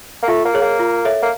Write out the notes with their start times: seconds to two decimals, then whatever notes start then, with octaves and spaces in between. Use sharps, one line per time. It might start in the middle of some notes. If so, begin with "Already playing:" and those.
0.23 A#3
0.28 A3 F4
0.45 A#3
0.54 G#4 C#5
0.62 A#3
0.79 F4
1.05 A4 C#5 E5
1.22 A#3